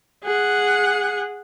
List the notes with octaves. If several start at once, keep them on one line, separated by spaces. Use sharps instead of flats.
G#4 F#5